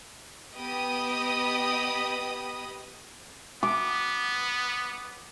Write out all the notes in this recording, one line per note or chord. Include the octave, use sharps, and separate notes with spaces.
B3 G4 D#5 B5 D#6
B3 D6